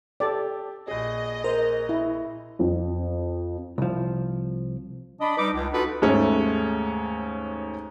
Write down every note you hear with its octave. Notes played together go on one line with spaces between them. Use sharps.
G4 A4 D5
A#1 G#4 D#5
A#4 C5
E4
F2
C2 F3
D4 D#5 B5
G3 D#4 B4 D6
C#2
D4 D#4 F4 F#4 A4 B4
D#2 G#2 G#3 A3 C#4